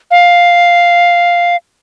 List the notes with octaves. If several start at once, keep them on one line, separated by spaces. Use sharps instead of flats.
F5